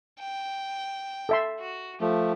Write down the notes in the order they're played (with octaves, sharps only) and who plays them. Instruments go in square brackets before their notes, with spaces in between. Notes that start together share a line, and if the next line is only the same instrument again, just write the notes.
[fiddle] G5
[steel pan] A4 E5 C6
[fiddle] F#4
[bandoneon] F3 A3 [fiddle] G4